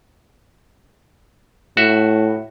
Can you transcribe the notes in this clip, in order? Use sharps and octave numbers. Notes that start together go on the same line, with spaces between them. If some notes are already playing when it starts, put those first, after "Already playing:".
A2 F#4 E5